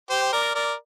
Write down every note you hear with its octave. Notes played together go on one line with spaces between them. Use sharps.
G4 C5
A#4 D5
A#4 D5